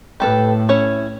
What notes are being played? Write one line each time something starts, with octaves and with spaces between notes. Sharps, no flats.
A2 G4 A4 B4
C#4 E4 C#5